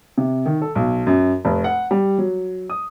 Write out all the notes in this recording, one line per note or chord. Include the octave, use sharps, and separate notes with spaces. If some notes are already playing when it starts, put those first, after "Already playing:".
C3
D#3
A4
B1
F#2
F1
F#5
G3
F#3
D#6